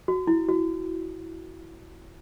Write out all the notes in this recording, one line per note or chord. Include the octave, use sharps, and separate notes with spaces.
F#4
E4
F#4